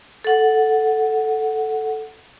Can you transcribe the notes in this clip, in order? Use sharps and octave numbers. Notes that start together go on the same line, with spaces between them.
A4 F#5